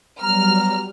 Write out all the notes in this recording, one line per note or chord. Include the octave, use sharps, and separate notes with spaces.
F#3 G3 B3 A#5 F6